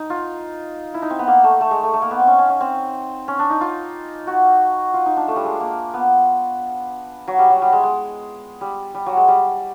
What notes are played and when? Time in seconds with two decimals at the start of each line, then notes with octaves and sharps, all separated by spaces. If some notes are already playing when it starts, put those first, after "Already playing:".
Already playing: D#4
0.10 F4
0.94 E4
1.02 D#4
1.10 C4
1.19 B3
1.28 A#3
1.44 A3
1.61 A3
1.71 G#3
1.83 A3
1.94 A3
2.02 A#3
2.11 B3
2.19 C4
2.27 C#4
2.38 C#4
2.49 C#4
2.61 C4
3.28 C#4
3.39 D4
3.50 D#4
3.61 F4
4.27 F#4
4.94 F4
5.06 D#4
5.17 D4
5.28 A3
5.36 G3
5.45 G#3
5.60 A#3
5.94 B3
7.28 F#3
7.39 G3
7.50 F#3
7.62 G3
7.73 G#3
7.83 G#3
8.61 G3
8.95 G3
9.06 F#3
9.17 G#3
9.28 G3